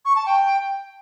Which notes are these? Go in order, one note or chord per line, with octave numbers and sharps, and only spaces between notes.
C#6
A5
G5